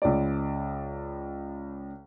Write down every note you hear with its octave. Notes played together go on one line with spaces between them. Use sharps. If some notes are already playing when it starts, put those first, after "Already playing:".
C#2 D5